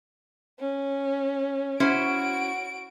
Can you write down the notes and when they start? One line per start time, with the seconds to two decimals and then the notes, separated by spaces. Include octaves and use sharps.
0.59 C#4
1.80 C#4 E4 F#4 C5 D7